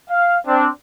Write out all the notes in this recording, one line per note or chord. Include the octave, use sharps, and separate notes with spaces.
F5
C4 D4